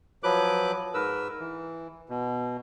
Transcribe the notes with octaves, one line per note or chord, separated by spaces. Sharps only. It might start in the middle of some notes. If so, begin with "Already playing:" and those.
F3 F#3 B4 D6 F#6
G#2 A#4 B4 E6
E3
B2